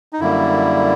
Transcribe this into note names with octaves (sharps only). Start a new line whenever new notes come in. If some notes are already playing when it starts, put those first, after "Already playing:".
D#4
F#2 D3 G3 A#3 E4